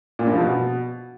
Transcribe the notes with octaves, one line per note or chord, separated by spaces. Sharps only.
A#2
G2
F3
B2